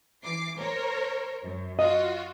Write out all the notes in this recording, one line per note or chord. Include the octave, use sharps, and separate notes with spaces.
E3 D6 C7
A#4 C5 C#5
F#2
F4 F#4 D#5